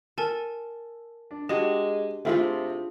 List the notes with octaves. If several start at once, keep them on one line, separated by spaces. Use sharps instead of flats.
A4 A#4 G#5 A5
D4
G#3 D4 F#4 G4 D#5 G5
C3 A3 D4 E4 F4 G#4